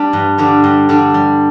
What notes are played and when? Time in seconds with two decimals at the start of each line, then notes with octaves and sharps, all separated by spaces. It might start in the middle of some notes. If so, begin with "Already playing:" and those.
Already playing: G3 D4
0.13 G2
0.38 D3 G3 D4
0.64 G2
0.89 D3 G3 D4
1.14 G3